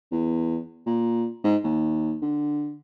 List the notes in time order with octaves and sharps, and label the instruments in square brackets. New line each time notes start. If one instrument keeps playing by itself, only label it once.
[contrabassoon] E2
A#2
G#2
D#2
D3